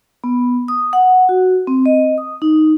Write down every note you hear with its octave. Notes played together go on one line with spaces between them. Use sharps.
B3
D#6
F#5
F#4
C4
D#5
D#6
D#4